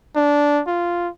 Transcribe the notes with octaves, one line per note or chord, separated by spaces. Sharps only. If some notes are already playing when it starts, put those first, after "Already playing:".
D4
F4